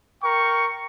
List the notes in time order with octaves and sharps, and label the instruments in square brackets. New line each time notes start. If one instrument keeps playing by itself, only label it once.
[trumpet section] A#4 G5 C#6